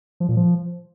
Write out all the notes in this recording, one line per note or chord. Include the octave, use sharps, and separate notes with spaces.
F3
A#2
F3